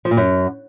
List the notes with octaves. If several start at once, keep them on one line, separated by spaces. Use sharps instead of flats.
F3
A#2
F#2